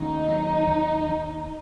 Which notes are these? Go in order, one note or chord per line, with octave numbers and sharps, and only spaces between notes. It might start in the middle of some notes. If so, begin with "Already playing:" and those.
Already playing: D#2 C#3 D#4
F#3
D#2
D#2